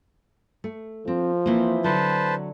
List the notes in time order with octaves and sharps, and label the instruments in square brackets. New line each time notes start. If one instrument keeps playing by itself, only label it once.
[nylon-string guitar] A3
[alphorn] F3 [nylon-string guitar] C4
[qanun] E3 C4 [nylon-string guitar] A#3
[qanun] D3 [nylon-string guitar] F#3 [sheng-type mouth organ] B4 C5 A5